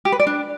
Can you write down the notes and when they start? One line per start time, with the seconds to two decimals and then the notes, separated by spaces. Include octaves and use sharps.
0.05 G4
0.12 B4
0.20 D5
0.27 D4